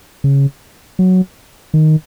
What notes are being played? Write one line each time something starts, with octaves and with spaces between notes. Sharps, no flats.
C#3
F#3
D#3